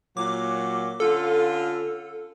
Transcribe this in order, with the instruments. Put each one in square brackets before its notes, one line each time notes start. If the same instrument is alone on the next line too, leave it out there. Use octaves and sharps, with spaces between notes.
[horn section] A#2 F#3 [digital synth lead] D6
[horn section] D3 C#4 F4 [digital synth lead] A4